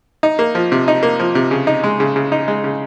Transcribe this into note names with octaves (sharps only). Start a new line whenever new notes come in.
D#4
A#3
F3
C3
D#4
A#3
F3
C3
C#3
D#4
G#3
C#3
C#3
D#4
G#3
C#3